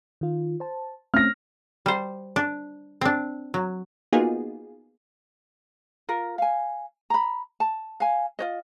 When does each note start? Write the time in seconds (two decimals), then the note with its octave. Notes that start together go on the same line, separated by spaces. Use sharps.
0.21 D#3 F4
0.60 C5 A5
1.14 A3 C4 C#4 F6 A#6
1.86 G3 C5
2.36 D4
3.01 C4 D4
3.54 F#3
4.13 A#3 B3 D#4 F4 F#4 G#4
6.09 F4 A#4
6.38 F5 G#5
7.10 A#5 B5
7.60 A5
8.00 F5 G#5
8.39 F4 C#5 D#5